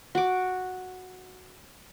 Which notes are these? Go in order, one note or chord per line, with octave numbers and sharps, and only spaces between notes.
F#4 D6